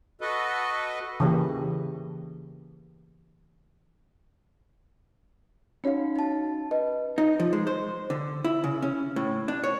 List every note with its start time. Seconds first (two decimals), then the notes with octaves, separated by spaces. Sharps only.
0.21 F#4 A4 B4 D#5
1.20 C#3 E3 A#3 G4
5.84 C#4 D#4 F#4 C#5 F5
6.16 D#4 A5
6.71 B4 D#5
7.18 D#4
7.40 F3
7.53 G#3
7.67 C5
8.10 D3
8.44 E4
8.64 C#3
8.82 C#4
9.16 A2
9.48 D4
9.64 C#5